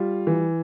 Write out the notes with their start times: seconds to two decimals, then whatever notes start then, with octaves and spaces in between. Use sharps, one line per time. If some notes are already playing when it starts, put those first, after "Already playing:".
Already playing: G3 F4
0.27 E3